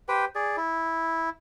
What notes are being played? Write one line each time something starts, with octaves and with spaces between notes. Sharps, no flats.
G4 B4 C5 G5
G#4 D5
E4